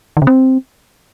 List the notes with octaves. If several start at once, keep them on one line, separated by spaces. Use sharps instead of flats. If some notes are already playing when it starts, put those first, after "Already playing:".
D#3
C#3
C4